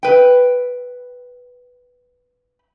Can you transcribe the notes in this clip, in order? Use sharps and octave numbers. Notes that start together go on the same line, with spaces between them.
B4 G5